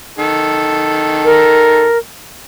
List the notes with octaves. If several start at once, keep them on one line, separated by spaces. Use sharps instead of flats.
D#3 A4
A#4